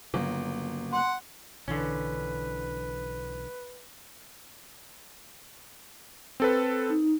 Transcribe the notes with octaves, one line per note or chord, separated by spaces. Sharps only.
G1 C#3 F#3 A#3
F#5 C6
B1 D3 E3 C#4 B4
C4 A4 B4
D#4